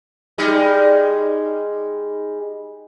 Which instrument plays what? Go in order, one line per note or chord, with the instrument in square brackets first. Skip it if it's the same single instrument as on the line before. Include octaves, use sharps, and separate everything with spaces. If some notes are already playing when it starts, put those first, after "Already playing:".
[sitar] G3 G#3 D#4